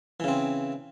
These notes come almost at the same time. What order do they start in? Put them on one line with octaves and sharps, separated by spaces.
E3 C#3 C4